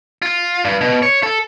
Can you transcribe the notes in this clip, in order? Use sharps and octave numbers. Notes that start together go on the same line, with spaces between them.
F4
G2
B2
C#5
A4